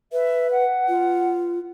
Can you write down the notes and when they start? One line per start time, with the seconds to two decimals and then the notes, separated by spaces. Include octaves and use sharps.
0.12 B4 E5
0.52 F#5
0.89 F4